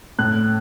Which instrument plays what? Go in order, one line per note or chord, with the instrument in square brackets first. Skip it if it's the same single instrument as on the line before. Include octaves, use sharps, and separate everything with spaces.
[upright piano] A2 F#6